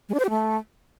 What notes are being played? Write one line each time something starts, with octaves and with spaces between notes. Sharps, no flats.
G#3
D4
C5
G4
A3